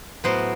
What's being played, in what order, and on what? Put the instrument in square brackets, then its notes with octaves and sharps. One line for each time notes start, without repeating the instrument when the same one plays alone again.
[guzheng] A2 F#3 B3 C5